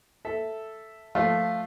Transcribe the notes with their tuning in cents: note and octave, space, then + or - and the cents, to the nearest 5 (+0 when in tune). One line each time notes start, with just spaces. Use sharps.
A4 +0 E5 +0
F3 +0 A3 +0 F4 +0